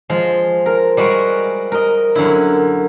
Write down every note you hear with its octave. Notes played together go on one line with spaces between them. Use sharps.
F3 G#3
A#4
G3 G#3 F#4 A#4
A#4 D#5
F#2 D3 E4